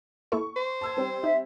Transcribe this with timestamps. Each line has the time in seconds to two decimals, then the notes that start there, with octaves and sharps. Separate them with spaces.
0.32 A#3 E4 A4 C#6
0.56 C5
0.81 A5 E6 G#6
0.97 G3 C4 G4
1.24 D#4 E5